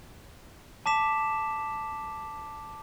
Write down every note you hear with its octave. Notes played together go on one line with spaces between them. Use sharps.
A5 D6 B6 E7